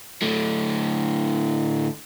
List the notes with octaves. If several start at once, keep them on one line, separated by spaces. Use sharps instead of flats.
A2 D3